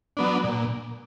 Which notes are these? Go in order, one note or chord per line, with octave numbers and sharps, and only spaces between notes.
F#3 B3 D4
A#2